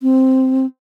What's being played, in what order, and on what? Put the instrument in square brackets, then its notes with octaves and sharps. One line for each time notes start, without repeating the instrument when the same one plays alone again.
[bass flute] C4